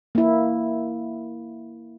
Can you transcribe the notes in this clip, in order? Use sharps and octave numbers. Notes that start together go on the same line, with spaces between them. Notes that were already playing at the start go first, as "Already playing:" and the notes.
A#3 E4